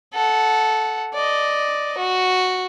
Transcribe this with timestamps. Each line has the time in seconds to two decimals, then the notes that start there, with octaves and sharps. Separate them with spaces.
0.14 A4 F#5
1.14 D5 D#5
1.98 F#4